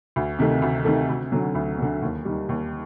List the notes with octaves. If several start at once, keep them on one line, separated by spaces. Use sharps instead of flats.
D2
C3 D#3 A3
D2
C3 D#3 A3
D2
D3 F#3
D2
D3 F#3
D#2
D#3 G3
D#2